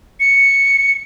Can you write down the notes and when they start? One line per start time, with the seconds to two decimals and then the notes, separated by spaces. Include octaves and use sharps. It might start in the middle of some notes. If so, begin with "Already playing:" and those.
0.20 C#7